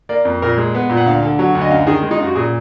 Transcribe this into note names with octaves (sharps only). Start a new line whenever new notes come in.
A#3 D5
F2
A#2 A#4
G#3
B3
A#2
F#5
D2 F5
D3
F#3
D2
D#5
F#2 F5
D#3 G#4
G#3
D#4
F#2 F4
F#4
A#2 G#4